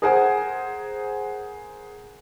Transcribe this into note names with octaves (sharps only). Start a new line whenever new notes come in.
G#4 A#4 C5 F#5 G#5